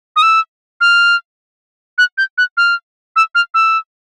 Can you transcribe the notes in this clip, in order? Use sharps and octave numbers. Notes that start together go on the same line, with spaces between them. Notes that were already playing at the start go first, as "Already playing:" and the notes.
D#6
E6
F6
F#6
G6
F#6
F6
E6
F6
E6